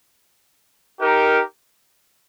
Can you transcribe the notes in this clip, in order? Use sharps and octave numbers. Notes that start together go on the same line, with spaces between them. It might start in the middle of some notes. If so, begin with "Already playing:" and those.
D#4 G4 A#4